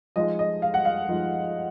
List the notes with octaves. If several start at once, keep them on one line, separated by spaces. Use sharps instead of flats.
F3 G#3 D#4 D#5
D#5
F5
F#5
F5
F3 G#3 D#4